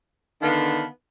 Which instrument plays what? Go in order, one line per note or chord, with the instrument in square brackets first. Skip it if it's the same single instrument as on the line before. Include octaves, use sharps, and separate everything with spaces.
[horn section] D3 D#3 B3 F5 A5